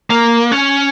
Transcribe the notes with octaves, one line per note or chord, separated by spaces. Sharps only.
A#3
C#4